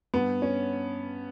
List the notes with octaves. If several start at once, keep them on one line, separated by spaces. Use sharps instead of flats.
G2 B3
C#4